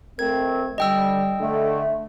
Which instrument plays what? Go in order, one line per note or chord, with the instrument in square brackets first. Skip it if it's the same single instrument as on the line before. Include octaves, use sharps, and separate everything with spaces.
[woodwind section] F2 A3 C4 [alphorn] A#4 [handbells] G#6
[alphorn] D3 [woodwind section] G3 [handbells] D#5 G5 E6
[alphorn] D3 [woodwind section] A3